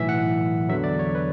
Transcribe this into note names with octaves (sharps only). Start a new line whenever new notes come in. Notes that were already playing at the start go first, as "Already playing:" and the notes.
Already playing: B1 A2 E3 E5
F#5
E2 D3 F#3 E5
D5
C#5
B4